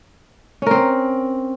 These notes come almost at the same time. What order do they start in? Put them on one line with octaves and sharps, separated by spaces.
C#4 A#4 C4